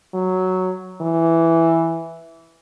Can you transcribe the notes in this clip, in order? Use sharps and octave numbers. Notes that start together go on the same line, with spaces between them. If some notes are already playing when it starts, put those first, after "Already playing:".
F#3
E3